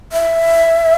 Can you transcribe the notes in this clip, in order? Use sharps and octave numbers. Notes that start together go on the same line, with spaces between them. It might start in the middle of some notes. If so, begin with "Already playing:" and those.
E5